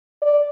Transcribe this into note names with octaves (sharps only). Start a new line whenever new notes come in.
D5